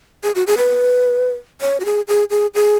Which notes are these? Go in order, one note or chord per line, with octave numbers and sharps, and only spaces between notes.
G#4
F#4
G#4
B4
C#5
F#4
G#4
G#4
G#4
G#4